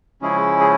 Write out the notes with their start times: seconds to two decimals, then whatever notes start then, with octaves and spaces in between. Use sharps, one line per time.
0.22 C#3 F3 G#3 C#4 E4 G#4
0.60 G#4